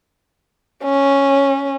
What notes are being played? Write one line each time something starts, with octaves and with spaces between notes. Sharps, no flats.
C#4